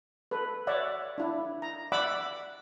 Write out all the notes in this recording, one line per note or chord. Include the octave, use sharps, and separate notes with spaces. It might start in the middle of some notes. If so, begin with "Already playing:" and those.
A4 B4
C#5 D5 E5 F#5
D4 E4
A#5
D5 E5 F#5 B5 D6 E6